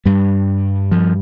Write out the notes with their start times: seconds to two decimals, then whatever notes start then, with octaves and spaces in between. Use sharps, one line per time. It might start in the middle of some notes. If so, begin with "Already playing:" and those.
0.06 G2 G3
0.91 F3